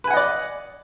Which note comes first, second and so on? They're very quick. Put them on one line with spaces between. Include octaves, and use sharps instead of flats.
B4 G#5 F#5 D#5 D5